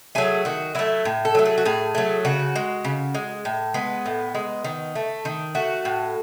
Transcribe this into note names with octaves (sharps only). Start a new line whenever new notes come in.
F#3 A3 G#4
D#3 F#4
F#3 A3 E4
A2
A4
F#3 A3
G#4
F#4
A2 G#4
F#3 A3
C#3 F#4
G#3
C#3
G#3
A2
G#3 B3
A2
G#3
D#3
A3
D#3
A3 F#4
A2